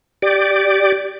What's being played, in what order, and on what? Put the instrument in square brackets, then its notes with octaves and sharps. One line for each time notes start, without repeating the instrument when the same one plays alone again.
[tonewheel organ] G4 D5